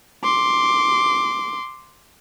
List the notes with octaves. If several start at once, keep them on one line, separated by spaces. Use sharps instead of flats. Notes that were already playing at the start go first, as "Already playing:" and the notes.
C6 D6